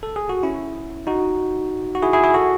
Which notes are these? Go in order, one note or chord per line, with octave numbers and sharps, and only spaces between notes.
A4
G#4
F#4
C#4 E4
D#4 F#4
F#4
E4 G#4
E4 G#4
E4 G#4
F#4 A4